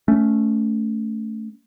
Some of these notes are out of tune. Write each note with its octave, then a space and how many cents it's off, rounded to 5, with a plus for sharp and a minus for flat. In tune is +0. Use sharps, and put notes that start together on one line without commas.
A3 +0 C#4 +20